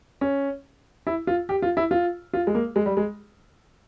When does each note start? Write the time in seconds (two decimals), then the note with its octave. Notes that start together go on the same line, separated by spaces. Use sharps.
0.21 C#4
1.07 E4
1.27 F4
1.49 G4
1.62 F4
1.77 E4
1.91 F4
2.33 F4
2.47 G#3
2.55 A#3
2.76 G#3
2.86 G3
2.97 G#3